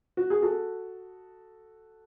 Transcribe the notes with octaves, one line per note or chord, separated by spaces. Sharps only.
F#4
G#4
F#4 A4